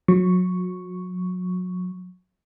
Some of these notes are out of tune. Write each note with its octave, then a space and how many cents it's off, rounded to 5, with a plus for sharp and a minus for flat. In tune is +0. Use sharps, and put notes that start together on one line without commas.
F#3 -30 C#6 +0